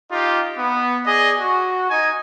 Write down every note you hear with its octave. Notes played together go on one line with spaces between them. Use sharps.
D#4 F4 G4
B3
G#4 D5 D#5
F#4
D#4 D#5 G#5